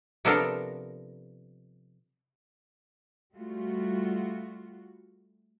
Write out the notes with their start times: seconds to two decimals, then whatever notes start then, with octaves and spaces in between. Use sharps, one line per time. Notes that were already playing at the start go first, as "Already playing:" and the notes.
0.25 C3 F3 B3 D4 A4 A#4
3.34 G3 A3 F4 F#4